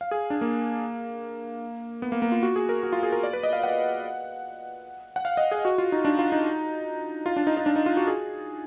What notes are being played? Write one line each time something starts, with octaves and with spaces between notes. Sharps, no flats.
F5
G#4
D4
A#3
B3
A#3
A#3
F4
F#4
G#4
A#4
F#4
F4
G#4
A#4
D5
B4
D#5
F5
F#5
F#5
F5
D#5
G#4
F#4
F4
D#4
D4
F4
D#4
F4
D4
D#4
D#4
D4
D#4
F4
F#4
G#4